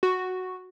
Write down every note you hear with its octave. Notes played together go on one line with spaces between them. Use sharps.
F#4